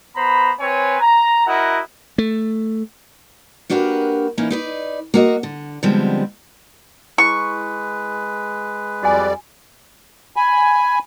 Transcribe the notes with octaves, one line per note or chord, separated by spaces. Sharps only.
B3 C5 A#5 B5
C4 B4 C#5 G#5
A#5
E4 F#4 A#4 D#5 F#5
A3
A#3 D4 F#4 G4 A#4 B4
E3 A#3 C#4 D#4 E4
D#4 B4 D5
A#3 F#4 D#5
D3
D3 F3 G3 G#3 B3 C4
G#3 E4 B4 C#6
F2 G3 F#4 D5 G#5
G#5 B5